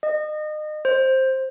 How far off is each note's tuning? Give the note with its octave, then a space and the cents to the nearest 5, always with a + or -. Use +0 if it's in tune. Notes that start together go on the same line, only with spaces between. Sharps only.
D#5 -30
C5 +10